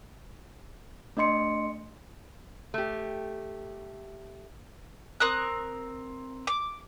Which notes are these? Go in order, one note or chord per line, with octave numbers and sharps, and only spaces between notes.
A3 D4 D#5 C6 C#7
A3 G4
C4 A#4 D#6 F#6
D6